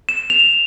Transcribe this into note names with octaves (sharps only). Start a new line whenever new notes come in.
E7
F7